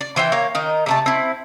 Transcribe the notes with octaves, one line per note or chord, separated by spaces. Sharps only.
D5
E3 C5 E5 G5
A#3 C#5
D#3 D#4
C3 A3 A5
C4 E4